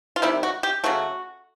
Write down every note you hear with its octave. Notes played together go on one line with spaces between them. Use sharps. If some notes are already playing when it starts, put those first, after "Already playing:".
F4
C3 D#3 G3 E4
F#4
G4
C#3 F#3 A3 F#4